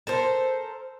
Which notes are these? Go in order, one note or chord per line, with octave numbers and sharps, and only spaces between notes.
A4 A#4 C5